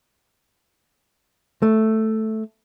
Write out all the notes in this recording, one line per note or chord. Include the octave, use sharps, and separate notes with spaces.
A3